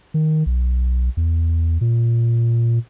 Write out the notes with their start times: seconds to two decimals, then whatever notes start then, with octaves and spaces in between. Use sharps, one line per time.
0.14 D#3
0.46 B1
1.17 E2
1.81 A#2